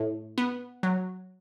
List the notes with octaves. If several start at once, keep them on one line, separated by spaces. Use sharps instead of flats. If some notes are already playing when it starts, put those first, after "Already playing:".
Already playing: A2
B3
F#3